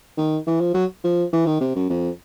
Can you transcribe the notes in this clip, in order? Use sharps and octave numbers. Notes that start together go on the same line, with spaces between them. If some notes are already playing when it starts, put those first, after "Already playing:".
D#3
E3
F3
F#3
F3
E3
D#3
C3
F#2
F2